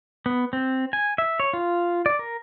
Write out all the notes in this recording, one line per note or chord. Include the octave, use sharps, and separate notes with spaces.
B3
C4
G#5
E5
C#5
F4
D5
A#4